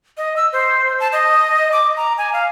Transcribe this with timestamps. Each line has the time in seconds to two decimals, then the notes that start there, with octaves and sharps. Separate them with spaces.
0.17 D#5
0.36 E6
0.53 C5
1.00 A5
1.12 D#5
1.72 D6
1.97 A#5
2.18 G#5
2.33 F5